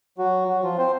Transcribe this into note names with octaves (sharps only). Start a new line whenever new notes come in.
F#3 F#4
F#3 F#4
F3 F4
C4 C5